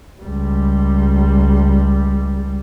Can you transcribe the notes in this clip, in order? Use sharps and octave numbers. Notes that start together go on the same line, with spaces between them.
C#2 G3